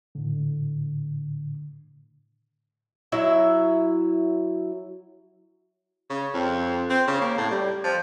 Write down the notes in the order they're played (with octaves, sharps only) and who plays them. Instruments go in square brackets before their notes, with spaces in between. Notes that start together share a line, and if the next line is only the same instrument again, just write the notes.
[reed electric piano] A2 D3
[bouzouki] F#3 E4 E5
[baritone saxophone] C#3
F2
C4
C#3
A#3
A2
G3
F3